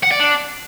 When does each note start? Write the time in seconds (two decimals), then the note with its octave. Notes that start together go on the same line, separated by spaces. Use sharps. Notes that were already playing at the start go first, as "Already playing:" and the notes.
0.03 F#5
0.11 D5
0.20 D4